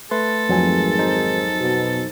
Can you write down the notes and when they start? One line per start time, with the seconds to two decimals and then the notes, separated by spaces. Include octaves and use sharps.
0.11 A3 A4 B4 C6
0.49 G#1 F2 F#3 G#5
0.99 D#4 C5
1.59 B2